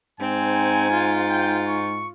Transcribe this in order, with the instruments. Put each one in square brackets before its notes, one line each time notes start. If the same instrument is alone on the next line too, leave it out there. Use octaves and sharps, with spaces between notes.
[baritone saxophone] G#2 [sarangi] C4 [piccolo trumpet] G#5
[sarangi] F4
[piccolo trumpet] G5
C#6